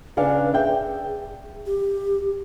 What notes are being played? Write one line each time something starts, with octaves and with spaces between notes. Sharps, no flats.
C#3 D4 B4 F5
G#4 E5 G5
G4